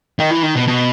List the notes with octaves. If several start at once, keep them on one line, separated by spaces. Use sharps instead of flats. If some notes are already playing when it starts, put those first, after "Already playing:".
D#3
E3
D#3
B2
B2